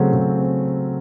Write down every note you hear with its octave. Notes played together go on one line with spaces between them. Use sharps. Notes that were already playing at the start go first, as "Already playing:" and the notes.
Already playing: C#3 F#3 A3 C4
C#3
C4